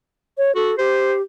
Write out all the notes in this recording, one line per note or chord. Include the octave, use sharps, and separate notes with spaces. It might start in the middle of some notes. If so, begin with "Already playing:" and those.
C#5
F#4 A4
G4 C5